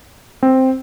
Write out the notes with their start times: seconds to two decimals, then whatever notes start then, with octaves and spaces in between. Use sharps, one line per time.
0.43 C4